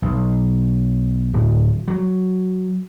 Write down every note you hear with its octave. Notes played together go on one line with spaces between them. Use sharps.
B1
D1
F#3